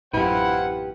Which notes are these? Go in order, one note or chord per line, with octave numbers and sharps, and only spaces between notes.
A1 F#2 E4 F4 G4 B4 C5 F#5